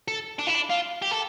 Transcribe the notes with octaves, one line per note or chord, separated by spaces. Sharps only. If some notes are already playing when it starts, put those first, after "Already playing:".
A4
D4
E4
D4
F4
G4
A4